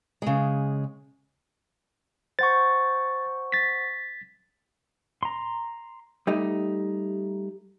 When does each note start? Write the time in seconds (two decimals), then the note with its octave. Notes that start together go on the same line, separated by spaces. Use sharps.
0.22 C#3 G#3
2.39 C5 F#5 C#6 A6
3.52 A6 B6
5.23 A#5 C6
6.27 G3 A3 D#4